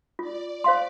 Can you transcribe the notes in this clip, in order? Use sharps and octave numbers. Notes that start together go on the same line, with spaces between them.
F4 D5
C5 F5 C6